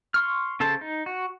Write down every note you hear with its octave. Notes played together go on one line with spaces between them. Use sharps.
C6 C#6 F6
C#3 A4 C5 A5
D#4
F#4